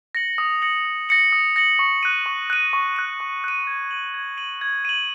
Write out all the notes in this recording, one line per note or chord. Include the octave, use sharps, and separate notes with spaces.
A#6 C#7 F#7
D#6
A#6 C#7 F#7
D#6
A#6 C#7 F#7
D#6
A#6 C#7 F#7
C#6
F#6 D#7
C#6
F#6 D#7
C#6
F#6 D#7
C#6
F#6 D#7
G#6
D#7 F#7
G#6
D#7 F#7
G#6
D#7 F#7